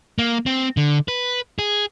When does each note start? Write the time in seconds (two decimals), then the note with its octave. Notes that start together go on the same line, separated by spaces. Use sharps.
0.18 A#3
0.46 C4
0.77 D3
1.08 B4
1.59 G#4